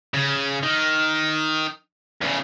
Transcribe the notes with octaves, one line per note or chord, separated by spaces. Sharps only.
C#3
D#3
E2 C#3